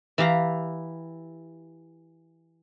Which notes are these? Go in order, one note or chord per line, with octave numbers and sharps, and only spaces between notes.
E3 E4 G4 F5 A#5